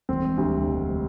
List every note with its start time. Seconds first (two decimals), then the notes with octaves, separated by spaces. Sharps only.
0.09 E1 C4
0.37 D2 D3 G3
0.67 E1